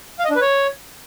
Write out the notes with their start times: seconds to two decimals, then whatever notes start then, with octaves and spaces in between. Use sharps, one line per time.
0.19 F5
0.24 D#5
0.30 D4
0.35 B4
0.41 C#5